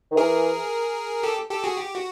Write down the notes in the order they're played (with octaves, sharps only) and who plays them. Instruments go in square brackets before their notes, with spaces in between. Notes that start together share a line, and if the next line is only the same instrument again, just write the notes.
[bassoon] D#3
[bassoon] E3 [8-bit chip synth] G#4 A#4
[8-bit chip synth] G4 A4
G4 A4
F#4 G#4
G4
F#4